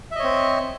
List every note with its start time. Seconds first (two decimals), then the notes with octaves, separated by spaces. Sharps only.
0.11 E5
0.15 D#5
0.20 C#5
0.24 C4